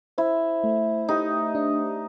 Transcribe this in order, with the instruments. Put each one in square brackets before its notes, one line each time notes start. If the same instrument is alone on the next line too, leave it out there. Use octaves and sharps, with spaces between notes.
[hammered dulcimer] E4 [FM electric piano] C5
[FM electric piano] A3
[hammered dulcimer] D#4 [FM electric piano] G4
[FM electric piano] D4